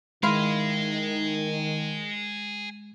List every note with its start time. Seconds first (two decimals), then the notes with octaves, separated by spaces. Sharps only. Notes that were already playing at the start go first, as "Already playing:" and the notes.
0.23 D#3 G#3 E4 G#4 D#5 F5 C6